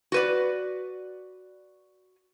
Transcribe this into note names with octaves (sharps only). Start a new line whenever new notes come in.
F#4 B4 D5